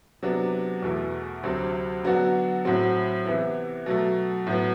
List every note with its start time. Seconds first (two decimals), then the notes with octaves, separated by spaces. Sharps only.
0.23 C3 F#3 B3 D4
0.82 E2 B2 A3 E4
1.43 D2 C3 F#3 C4
2.04 D3 F#3 B3 D4 F#4
2.65 A2 F#3 C4 F#4
3.26 C3 E3 B3 E4
3.86 B2 F#3 A3
4.47 A2 F#3 B3